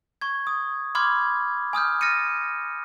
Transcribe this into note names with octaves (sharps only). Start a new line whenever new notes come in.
C#6 G#6
D#6
B5 C6 D6 F6 G#6
G#5 D#6 F6 G6
F6 A6 A#6 C#7 D#7